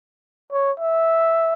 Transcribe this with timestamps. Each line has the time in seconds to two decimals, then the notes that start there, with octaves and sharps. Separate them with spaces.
0.52 C#5
0.79 E5